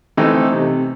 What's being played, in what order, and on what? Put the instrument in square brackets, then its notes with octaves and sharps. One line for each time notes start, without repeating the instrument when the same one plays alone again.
[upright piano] E3 A3 C4 D#4
C3